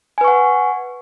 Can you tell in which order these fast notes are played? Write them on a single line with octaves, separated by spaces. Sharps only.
G#5 B4 C#6 F#5